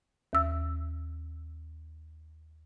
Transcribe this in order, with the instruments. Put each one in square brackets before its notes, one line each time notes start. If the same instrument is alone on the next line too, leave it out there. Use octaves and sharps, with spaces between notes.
[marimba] D#2 E6